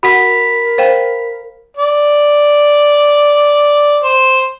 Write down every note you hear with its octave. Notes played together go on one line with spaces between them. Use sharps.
F#4 A#4 F#5 B5 B6
C5 F5 G5
D5
C5